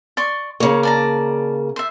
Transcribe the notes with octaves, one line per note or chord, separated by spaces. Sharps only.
D5 C6 C#6
C#3 A#3 C#5
D5 A5 A#5
C5 E5